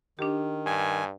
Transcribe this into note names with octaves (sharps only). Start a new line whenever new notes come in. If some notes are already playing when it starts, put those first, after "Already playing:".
D#3 D4 G4
G2 G#5